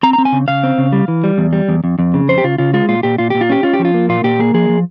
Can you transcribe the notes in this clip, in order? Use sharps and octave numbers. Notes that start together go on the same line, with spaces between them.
C4 A#5
C4 A#5
G#5
C#3
C#3 F5
C4
C#3
G3
E3
G3
E2
G3
E2
F2
F2
C#3
F2 C5
G4
C#3 F4
C#3 F4
G#3 F4
A#2 F4
A#2 G4
A#2 F4
A#2 G4
F4
C#4 G4
C#4 F4
G4
F3
F4
A#3
A#2 F4
A#2 G4
A#3 G#4
F3 G#4
F3